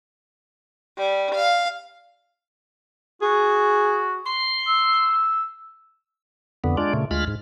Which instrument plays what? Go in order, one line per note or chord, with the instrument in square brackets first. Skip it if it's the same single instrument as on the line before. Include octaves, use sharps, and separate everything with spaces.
[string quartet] G3
F5
[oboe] F#4 [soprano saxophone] G#4
[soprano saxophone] C6
[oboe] E6
[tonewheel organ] F2 D3 B3
G#3 D4 F4 D5
A#2 C#3 A3
D2 G#3 F4 B5 F6
G#2